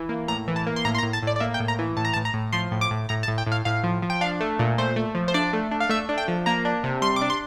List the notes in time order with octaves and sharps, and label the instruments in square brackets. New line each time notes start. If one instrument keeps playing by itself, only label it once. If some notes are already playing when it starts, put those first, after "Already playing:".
Already playing: [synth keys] E3
A#3
A2 A#5
E3
A5
A#3
C6
A2 A#5
C6
A#5
A2
A5
A2 D5
D5
A#3 E5
G5
A2
A#5
E3
A2 A5
A#5
A5
A2
A#5
A2
F3 C6
A2
D6
A2
A2 A#5
A5
A2
G5
A2
F5
A2 F5
F3
F3
G5
D4 F5
A3
A#2
A3 C5
A3
F3
C5
D4 D5
A3
D4
F5
A3 E5
D4
G5
F3
A#3 A#5
D4
C3
G3 C6
D6
D4
C6